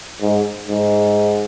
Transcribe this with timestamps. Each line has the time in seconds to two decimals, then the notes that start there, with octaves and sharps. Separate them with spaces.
0.22 G#2
0.69 G#2